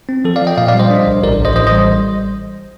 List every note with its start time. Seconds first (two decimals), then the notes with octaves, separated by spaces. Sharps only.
0.09 C4
0.25 F3 A4
0.36 D5 F5
0.41 F3
0.47 D#5 G5
0.57 A#2 D5 F5
0.68 D5 F5
0.74 G3
0.79 C5 D#5
0.90 D4
1.07 C2
1.23 A1 A#4 D5
1.39 A1
1.45 C5 D#5
1.56 A1 C5 D#5
1.67 C5 D#5
1.72 G3